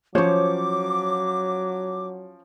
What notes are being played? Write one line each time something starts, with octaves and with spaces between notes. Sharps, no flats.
F3 F#3 C#4 C5 C#5 C#6 D6